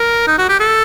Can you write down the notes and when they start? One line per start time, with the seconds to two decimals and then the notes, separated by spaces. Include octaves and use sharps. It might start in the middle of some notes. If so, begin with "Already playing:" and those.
Already playing: A#4
0.27 D#4
0.38 F#4
0.49 G4
0.60 A4